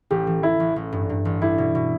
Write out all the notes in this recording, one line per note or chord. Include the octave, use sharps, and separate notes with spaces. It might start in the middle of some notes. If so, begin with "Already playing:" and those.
A1 G4
E3
E3 E4
A1
A1
G2
G2
A1
G3 E4
B2
B2